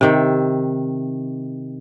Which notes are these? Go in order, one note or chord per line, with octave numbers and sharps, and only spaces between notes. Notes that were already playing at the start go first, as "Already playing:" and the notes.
C3 D#3 E5